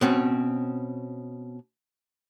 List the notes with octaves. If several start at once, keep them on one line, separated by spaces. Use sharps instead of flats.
B2 C4 C#4